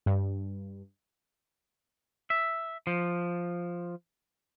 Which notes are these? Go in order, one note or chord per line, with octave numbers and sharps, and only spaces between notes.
G2
E5
F3